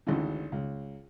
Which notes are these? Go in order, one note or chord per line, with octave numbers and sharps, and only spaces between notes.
G#1 D2 C#3 E3
C#2